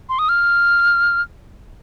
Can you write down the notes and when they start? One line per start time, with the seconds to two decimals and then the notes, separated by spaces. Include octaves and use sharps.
0.09 C6
0.19 D#6
0.29 F6